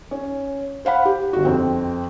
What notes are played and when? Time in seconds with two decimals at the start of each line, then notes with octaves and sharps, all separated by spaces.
0.11 C#4
0.85 C5 F5 F#5 B5
1.05 G4
1.33 G1 F#4
1.45 F2 C4